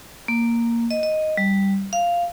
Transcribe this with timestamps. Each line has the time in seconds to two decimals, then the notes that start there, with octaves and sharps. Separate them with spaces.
0.28 A#3
0.91 D#5
1.03 D#5
1.37 G3
1.93 F5